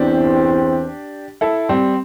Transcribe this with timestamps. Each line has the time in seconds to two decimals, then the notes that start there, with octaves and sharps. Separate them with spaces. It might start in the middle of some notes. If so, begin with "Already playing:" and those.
Already playing: E2 E3 C4 D4 G4
1.41 E4 A4
1.69 G3 C4